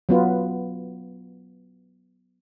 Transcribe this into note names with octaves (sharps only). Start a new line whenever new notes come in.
F#3 B3 F4 B4